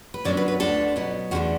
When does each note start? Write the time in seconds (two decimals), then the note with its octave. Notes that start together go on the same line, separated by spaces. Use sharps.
0.14 B4
0.25 F#2 F#3 B3 D4 D5
0.37 B4
0.48 B4
0.60 D2 D3 B3 D4 A4
0.96 B2 F#3 B3
1.31 E2 D3 A3 D4 F#4